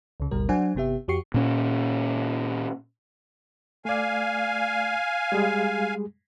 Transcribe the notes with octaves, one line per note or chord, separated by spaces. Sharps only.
C#2 C#3
G#1 D2 B2 G3 A#4
F#3 D4 C5 F#5 G#5
G1 C3 B3 G4 E5
F2 F#4 G4 C#6 C7 C#7
A#2 C#4
A3 D5 F5 G#5
G3 G#3 G#4